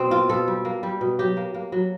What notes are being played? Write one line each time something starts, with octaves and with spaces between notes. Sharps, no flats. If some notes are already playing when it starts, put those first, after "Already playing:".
Already playing: B2 C4
A#3 F4
B2 A4
G3
A#3
G3
B2
F#3 G4
A#3
A#3
F#3